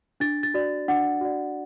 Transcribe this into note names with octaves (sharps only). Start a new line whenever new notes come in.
D4 A6
A6
F#4 D5
D4 F#5
F#4 D5